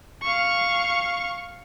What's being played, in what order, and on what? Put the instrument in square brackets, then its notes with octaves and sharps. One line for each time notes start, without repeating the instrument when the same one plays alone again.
[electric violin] F5 C#6